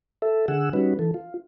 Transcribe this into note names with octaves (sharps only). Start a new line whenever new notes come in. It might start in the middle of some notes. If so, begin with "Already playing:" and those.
A4 E5
D3 G#4 F#5 E6
G3 C#4 D#4 F#4 B4
E3 A4
F4